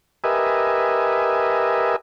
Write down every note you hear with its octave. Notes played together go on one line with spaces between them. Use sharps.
G4 A#4 B4 D#5 E5 G#5